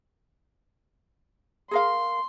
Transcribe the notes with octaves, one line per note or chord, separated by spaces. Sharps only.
G#4 A#4 F5 C6